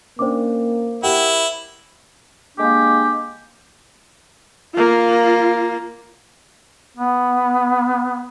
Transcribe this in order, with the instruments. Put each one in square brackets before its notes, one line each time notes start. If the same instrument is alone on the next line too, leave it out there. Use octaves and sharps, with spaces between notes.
[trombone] A#3 [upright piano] C#4 D4 G5 [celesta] C5 D6
[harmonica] E4 [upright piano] G4 A#4 F#5
[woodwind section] G#3 A#3 D4 G4
[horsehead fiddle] A#3 F4
[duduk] B3